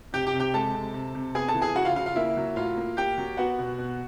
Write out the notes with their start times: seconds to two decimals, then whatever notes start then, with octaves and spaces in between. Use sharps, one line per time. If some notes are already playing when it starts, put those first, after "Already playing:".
0.13 C3 G4 G5
0.27 G4 G5
0.33 C3
0.40 G4 G5
0.54 G#3 A4 A5
0.75 C3
0.94 C3
1.15 C3
1.35 B3 G#4 G#5
1.48 A4 A5
1.55 E3
1.62 G#4 G#5
1.75 C#3 F#4 F#5
1.85 F4 F5
1.96 C#3 F4 F5
2.06 F4 F5
2.16 A#3 E4 E5
2.37 F#3
2.56 A2 F4 F5
2.77 A#3
2.97 A#3 G4 G5
3.18 F#3
3.37 B3 F#4 F#5
3.59 B2
3.78 B2